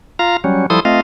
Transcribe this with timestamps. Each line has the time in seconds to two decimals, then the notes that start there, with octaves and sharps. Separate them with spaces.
0.19 F4 F5 A#5
0.44 F#3 G3 C#4
0.70 F3 G3 E4 A4 C6 D#6
0.85 A3 C4 F4 D#5 F5